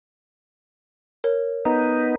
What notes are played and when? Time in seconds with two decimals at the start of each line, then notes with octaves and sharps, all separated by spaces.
1.24 A#4 C#5
1.65 B3 D#4 A#5